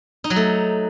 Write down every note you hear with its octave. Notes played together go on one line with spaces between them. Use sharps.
D#4
F#3
A3